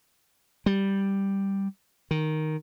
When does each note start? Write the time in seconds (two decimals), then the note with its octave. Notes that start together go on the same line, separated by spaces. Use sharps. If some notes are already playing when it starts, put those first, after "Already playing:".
0.66 G3
2.11 D#3